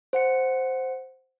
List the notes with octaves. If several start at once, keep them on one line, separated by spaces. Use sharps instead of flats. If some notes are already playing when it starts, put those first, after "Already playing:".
C5 F#5 C#7